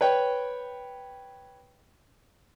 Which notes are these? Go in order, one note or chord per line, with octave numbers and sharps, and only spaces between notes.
B4 C#5 G5